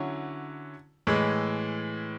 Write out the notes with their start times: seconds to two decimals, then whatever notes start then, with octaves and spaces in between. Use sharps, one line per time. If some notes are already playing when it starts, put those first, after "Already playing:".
Already playing: D3 F#3 C#4 E4
1.07 A2 E3 G#3